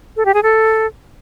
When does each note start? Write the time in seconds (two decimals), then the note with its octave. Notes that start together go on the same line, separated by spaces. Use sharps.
0.17 A4
0.25 G4
0.34 G#4
0.43 A4